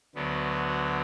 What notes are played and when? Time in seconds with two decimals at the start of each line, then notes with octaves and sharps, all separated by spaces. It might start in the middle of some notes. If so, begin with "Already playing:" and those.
0.15 D2 D3 F#3 B3